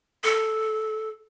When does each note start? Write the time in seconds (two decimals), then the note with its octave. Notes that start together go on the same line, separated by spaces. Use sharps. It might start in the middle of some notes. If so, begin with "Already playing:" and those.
0.24 A4